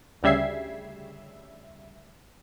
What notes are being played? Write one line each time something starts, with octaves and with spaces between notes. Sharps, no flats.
D2 C#3 G3 E5 G#6 C7